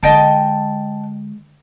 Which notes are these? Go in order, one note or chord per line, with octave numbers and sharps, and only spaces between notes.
D3 G#3 D#5 G5 A5